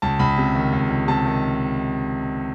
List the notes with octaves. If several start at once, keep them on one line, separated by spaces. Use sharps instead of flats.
C#2 A5
C#2 B5
C3
D#3
C#2
C#2
C3 A5
D#3